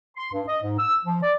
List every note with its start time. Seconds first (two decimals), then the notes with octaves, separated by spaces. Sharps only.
0.17 C6
0.32 G2
0.48 D#5
0.62 G#2
0.79 E6
1.05 F3
1.23 D5